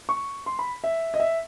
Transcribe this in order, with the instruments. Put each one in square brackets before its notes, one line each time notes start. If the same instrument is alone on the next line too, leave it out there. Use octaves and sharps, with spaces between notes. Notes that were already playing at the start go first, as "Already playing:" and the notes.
[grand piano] C#6
C6
B5
E5
D#5
E5